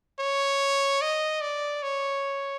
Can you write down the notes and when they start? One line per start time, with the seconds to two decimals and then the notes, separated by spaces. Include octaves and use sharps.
0.19 C#5
1.02 D#5
1.41 D5
1.83 C#5